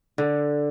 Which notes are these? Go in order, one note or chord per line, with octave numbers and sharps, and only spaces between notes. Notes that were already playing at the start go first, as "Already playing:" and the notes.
D3